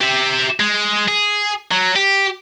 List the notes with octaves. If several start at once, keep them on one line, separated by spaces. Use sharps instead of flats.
G4 E5
G#3
G#4
F#3
G4